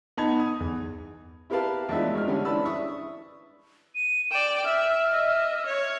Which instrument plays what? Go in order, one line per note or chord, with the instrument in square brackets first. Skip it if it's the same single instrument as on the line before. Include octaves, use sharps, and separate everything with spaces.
[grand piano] B3 D#4 A5 B5 G#6
D#6
E2
[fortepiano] E4 G4 A#4 B4 F5 A5
E2 A2 F3 G#3 D4 E5
G#1 G#3 F6
D3 G3 C#4
E3 D4 A5 B5 E6
E5 C#6 D#6
[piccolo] D#7
[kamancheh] D5 G5 [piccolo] E7
[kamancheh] E5 [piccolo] F6
[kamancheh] D#5 E5
C#5